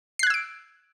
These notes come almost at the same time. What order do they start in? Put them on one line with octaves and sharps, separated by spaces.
C7 F#6 G#6 E6 D7